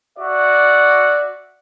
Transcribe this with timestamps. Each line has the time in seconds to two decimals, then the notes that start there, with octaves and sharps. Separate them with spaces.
0.19 F#4 D5 E5